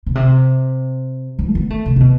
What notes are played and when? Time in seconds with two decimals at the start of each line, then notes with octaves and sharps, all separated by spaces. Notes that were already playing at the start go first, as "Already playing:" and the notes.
0.06 B2
0.15 C3
1.39 D3
1.47 A3
1.55 B3
1.70 A3
1.86 C3
1.96 C3
2.00 B2